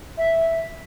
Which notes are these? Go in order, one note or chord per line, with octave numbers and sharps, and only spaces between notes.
E5